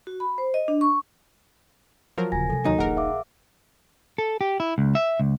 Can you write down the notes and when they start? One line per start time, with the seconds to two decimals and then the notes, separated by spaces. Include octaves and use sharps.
0.07 F#4
0.20 B5
0.38 C5
0.54 D#5
0.68 D4
0.81 C#6
2.18 F3 F#3 A#4
2.32 D#1 C#3 G#5 A#6
2.50 C3 G#3 A4
2.65 D#2 D#3 F#3 D#4
2.79 D#1 A#1 F2 G#4 A#4 F#5
2.97 E5 F5 D6
4.18 A4
4.41 G4
4.60 E4
4.78 C#2
4.95 E5
5.20 C#2